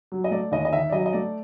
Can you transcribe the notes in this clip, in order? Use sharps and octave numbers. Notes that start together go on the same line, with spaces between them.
F#3
D#5
A3 D5
D#2 D#5
D#5
D#3 E5
D5
F#3 D#5
D#5
A3 D5